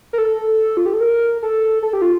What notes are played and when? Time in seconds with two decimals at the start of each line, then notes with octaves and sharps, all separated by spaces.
0.13 A#4
0.18 A4
0.77 F4
0.86 G4
0.94 A4
1.01 A#4
1.43 A4
1.83 A4
1.93 G4
2.02 F4